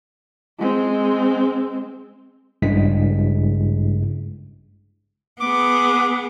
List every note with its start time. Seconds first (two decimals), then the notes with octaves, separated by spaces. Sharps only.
0.59 G#3 C4
2.62 A1 G2 C#3 G#3 E4 B6
5.40 B3 G#4 D6